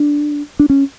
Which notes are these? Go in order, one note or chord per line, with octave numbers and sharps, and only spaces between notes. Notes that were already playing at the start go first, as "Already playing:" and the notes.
Already playing: D4
D4
C#4